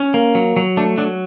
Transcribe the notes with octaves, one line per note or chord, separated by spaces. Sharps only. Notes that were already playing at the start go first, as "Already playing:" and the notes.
Already playing: C#4
A#3
F#3
F#3
A3 D4
F#3 D4